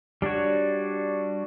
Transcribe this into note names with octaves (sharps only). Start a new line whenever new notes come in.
G3 D4 F#4 C#5